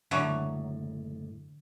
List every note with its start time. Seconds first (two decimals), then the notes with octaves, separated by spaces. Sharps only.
0.11 F#1 A2 D3 E3 F#3